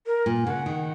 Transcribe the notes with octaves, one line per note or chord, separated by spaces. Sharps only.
A#4
A#2
C#3 F#5
D#3